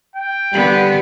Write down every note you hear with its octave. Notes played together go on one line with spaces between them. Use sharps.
G5
D3 G3 B3